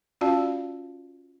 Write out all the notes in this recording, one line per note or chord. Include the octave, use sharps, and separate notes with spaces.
C#4 F4 F#4 D5 F5 A5